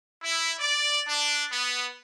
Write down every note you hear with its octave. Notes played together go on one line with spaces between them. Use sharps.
E4
D5
D4
B3